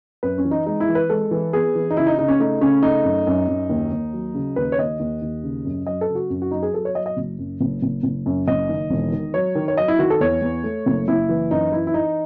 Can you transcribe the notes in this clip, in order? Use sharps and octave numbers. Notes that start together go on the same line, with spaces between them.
F#2 B4
C#4
E3
D#4
G#3 D#4
E4
E3
B4
G#3 A4
E3
B3 G#4
E3
D#4
C#3 E4
D#4
C#3 D#4
C#4
A3 D#4
C#3 C#4
A3 D#4
F#2
F#2
F#2
D#2
D#2
F#3
C#3
D#2 B4
C#5
D#2 D#5
D#2
D#2
C#3
F#2
F#3 D#5
A4
C#3
F#4
F#2
F#4
F#3 D#4
G#4
F#3 A4
C#5
F#3 D#5
D#5
F#1
F#2
F#1
F#1
F#1
F#2
F#1 D#5
D#3
E1
D#3
F#3 C#5
D#3
C#5
F#3 D#5
E4
D#3 F#4
A4
E2 C#5
E2
A3
F#1
F#1 E4
E3
F#2 D#4
E3 E4
E4
E3 D#4